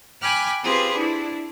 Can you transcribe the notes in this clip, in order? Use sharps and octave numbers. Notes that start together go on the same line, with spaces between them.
G5 G#5 B5 D6 F6 F#6
C4 F4 G4 G#4 B4
D4 E4